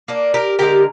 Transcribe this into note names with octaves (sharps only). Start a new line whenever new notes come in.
A#3 D4
G4 A#4
D3 G#3 G4 A#4